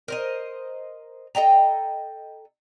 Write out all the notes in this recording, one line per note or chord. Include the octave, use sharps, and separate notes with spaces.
A#4 C5 D#5
A4 D#5 G5 A#5